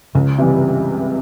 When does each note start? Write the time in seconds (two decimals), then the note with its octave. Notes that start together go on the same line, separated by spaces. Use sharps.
0.15 C#2 C#3
0.38 C3 E3 G3